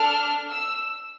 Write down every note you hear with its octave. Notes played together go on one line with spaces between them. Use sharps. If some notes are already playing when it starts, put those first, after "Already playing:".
Already playing: D4 A4 F6
E6